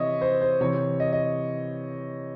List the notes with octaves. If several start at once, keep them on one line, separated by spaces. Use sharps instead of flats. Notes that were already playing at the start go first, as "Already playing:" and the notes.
Already playing: C3 E3 C#5 D#5 E5
C5
C5
C3 E3 C#5
D#5
D#5